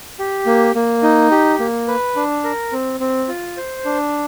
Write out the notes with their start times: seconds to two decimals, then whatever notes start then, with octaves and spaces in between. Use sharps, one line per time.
0.19 G4
0.46 A#3
0.75 A#3
1.03 D#4
1.31 G4
1.60 A#3
1.88 B4
2.16 D4
2.44 A#4
2.72 C4
3.00 C4
3.28 F4
3.57 C5
3.85 D4